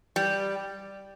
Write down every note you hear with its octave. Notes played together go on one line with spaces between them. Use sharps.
G3